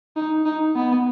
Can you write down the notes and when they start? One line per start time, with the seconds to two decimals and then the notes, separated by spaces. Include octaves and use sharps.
0.16 D#4
0.45 D#4
0.76 B3